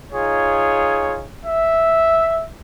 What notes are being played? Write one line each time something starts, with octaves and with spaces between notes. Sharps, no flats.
D#4 F4 G#4 C#5
E5